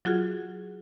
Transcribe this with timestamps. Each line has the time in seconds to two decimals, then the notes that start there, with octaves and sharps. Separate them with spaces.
0.05 F#3 F4 F#4 G#4